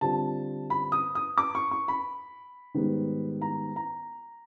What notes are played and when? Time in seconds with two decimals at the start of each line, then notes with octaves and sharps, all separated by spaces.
0.01 D3 G3 C4 F4 A5
0.70 B5
0.92 D#6
1.15 D#6
1.38 D6
1.55 C#6
1.71 C#6
1.88 B5
2.74 G#2 D#3 G3 B3
3.42 A#5
3.76 A#5